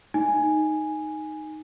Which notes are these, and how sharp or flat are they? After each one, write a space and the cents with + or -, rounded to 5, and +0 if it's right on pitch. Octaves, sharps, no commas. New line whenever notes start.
D#4 +0 G#5 +0